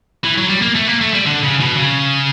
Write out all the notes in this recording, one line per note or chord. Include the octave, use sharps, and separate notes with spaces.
E3
F#3
G3
A#3
A3
A#3
A3
G3
D3
C#3
B2
C#3